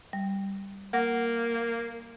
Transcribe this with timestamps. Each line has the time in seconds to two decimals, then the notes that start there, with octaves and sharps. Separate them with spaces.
0.13 G3
0.93 A#3 F#5 A#6